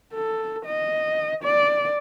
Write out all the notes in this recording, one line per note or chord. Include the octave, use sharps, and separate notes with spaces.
A4
D#5
D5